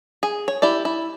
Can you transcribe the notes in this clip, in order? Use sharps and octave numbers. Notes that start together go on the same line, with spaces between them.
G#4
C#5
E4 G4 D5
E4